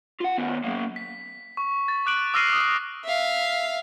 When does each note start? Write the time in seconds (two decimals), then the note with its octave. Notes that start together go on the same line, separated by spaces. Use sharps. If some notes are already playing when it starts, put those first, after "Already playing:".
0.21 F4 F#5
0.38 D#3 B3
0.64 F#3 A#3
0.96 B6
1.57 C#6
1.88 A6
2.06 D6 F#6 D7 F#7
2.34 D6 E6 F6 A#6 C7 D#7
2.53 D#6
3.04 E5 F5